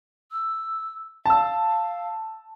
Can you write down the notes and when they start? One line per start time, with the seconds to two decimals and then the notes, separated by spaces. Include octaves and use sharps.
0.32 E6
1.26 F5 A5 E6